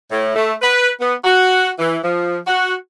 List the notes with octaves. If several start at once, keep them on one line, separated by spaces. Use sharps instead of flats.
A2
A3
B4
B3
F#4
E3
F3
F#4